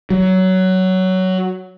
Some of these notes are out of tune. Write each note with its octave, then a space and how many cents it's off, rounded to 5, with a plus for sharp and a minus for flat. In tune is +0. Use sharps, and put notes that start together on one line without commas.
F#3 +15